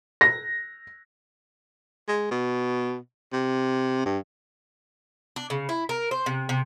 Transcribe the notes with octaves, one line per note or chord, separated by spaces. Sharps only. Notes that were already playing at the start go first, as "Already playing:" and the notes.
A#6
G#3
B2
C3
G2
D4
C#3
E4
A#4
C5
C3
C3